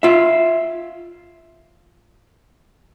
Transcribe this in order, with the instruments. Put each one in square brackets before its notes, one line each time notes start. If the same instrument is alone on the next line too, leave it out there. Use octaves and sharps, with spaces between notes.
[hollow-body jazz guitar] F4 E5